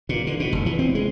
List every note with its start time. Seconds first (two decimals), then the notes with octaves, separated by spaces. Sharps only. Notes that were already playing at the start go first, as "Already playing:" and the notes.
0.09 A#2
0.27 D3
0.40 B2
0.53 F1
0.66 E3
0.79 C4
0.95 G#3